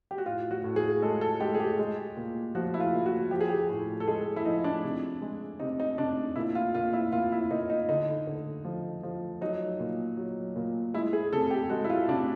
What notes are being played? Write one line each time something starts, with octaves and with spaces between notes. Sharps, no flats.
G4
F#4
A2 F4
F#4
A2
G#4
G#3 A4
A4
G#3 G4
G#4
G4
G#3
A#2
F3 F#4
E4
F4
A#2
F#4
F3 G4
G#4
G4
A2
A4
G#3 G#4
E4
F3 D#4
D4
C3
G#3
C3 D#4
D#4
C3 D4
A#2 E4
F4
A#2 F4
E4
A#2 F4
E4
A#2 D#4
D#4
D3 D#4
D3
F3
F3
F#3 D#4
A#2
F#3
A#2
G#3 E4
G#4
C3 A4
G4
G#3 F#4
E4
F4
C3 D4